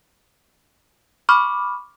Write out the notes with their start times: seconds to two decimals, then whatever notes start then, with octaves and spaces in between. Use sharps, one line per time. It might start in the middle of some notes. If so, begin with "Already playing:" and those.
1.29 B5 C#6 D6 F6